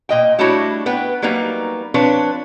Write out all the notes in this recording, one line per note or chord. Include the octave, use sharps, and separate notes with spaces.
A#2 D#5 G5
G3 A3 D4 E4 F#4 C#5
B3 B4 G5
F#3 G3 A#3 B3 D#4
F3 C4 D4 B4 C#5